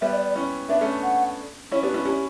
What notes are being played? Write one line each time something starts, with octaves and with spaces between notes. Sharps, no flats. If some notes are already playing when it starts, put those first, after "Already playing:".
G3 B3 E5
D5
D5
C#4 E4
B3 D4 E5
A3 C#4
F#5
C#4 E4 C#5
B3 D4 G4
C#4 E4
C#4 E4 G4